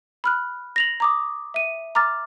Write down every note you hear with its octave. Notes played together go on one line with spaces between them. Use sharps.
B5 F6 F#6
A#6 F7 F#7
A#5 D6 D#6
E5 D#7
A#5 D6 F6 A6